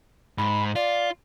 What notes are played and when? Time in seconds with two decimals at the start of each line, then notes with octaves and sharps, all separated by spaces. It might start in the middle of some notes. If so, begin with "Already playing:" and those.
0.38 G#2 B5
0.76 F4 D5